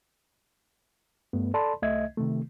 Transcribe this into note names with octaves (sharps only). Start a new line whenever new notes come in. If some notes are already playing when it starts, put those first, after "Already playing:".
G2 A3 B3
A4 D5 A5 B5 C6
C2 A3 D#5 E5 G#6
C3 D#3 A3